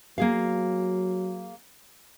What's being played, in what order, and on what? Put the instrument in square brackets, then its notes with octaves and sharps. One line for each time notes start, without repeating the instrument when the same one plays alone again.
[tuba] F#3 [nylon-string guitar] A#3 G#4 F5